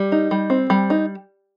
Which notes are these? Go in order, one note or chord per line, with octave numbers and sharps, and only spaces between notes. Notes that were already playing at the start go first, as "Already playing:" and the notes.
Already playing: G3
D#4
G3
C4
G3
D#4